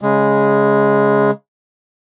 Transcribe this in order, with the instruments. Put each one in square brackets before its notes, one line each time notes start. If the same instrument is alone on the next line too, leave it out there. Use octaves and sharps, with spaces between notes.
[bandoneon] C#3 G#3